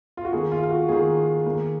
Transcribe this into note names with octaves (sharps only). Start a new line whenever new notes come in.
F4
F#4
D#3 A#3 G#4
F4
F4
F#4
D#3 A#3 G#4
D#3 A#3